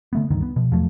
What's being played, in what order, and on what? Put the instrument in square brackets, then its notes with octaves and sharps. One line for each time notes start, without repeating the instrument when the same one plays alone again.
[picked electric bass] D3 A3 B3
C#2 G2 D3 D#3
B3
B2 F3
E2 F3 F#3 A3